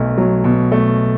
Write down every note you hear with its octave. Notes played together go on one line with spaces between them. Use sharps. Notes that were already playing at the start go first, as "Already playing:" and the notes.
Already playing: B1 B2 A3
F#3
B2
A3